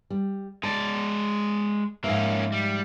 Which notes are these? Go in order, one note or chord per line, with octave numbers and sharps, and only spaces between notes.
G3
G#3 D5 A5
G#2 F3 A#3 C#4 E5
G3